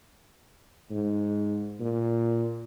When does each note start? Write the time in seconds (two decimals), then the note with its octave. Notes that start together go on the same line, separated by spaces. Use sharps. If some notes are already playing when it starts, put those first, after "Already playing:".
0.91 G#2
1.80 A#2